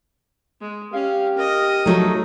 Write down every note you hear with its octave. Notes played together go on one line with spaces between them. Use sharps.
G#3
C#4 G4 F5
A#4 D#5
F3 F#3 A3 D#4